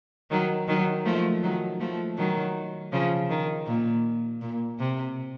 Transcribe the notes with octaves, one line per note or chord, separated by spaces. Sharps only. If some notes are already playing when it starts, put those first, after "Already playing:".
D#3 F#3
D#3 F#3
F3 A3
D#3 F#3
F3 A3
D#3 F#3
C#3 F3
D#3
A#2
A#2
C3